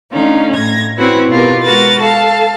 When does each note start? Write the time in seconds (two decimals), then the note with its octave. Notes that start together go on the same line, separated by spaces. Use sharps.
0.13 D3 A3 C#4 D#4 F4
0.54 A2 G#6 A#6
0.97 C4 C#4 E4 F#4 B4
1.30 B2 F4 G4 A#4 B4
1.62 G#3 F#4 A#4 B4 A6
2.02 A4 F5 A5